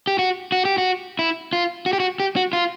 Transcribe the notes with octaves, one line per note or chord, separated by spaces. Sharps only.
G4
F#4
F#4
G4
F#4
E4
F4
F#4
G4
F#4
G4
F#4
F4